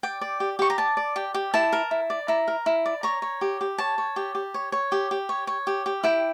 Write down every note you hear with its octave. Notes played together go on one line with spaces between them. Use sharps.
D5 G5
D5
G4
G4 C#6
A#5
D5 A5
D5
G4
G4
E4 A5
A#4
E4
D5
E4 A#5
A#4
E4
D5
C#5 A#5
C#5
G4
G4
C#5 A5
C#5
G4
G4
C#5
C#5
G4
G4
C#5
C#5
G4
G4
E4 G5